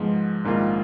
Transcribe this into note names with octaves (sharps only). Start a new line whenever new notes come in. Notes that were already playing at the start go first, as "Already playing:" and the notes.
Already playing: G#2 F3 G#3 B3
A#1 G#2 D#3 A#3 F4